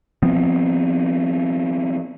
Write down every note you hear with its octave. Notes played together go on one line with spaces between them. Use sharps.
F3 B3 C4